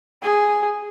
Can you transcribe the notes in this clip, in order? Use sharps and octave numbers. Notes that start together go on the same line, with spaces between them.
G#4